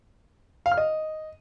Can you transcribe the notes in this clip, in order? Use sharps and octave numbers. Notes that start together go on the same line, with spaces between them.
F5
F6
D#5